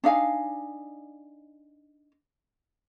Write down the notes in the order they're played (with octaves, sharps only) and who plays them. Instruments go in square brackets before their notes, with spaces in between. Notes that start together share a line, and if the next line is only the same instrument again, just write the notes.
[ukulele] D4 D#4 F5 G#5